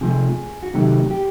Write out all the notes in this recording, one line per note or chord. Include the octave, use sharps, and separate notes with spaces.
C3 F3 A3 G#4
F#4
C3 D#3 F#3 A3 G4
G4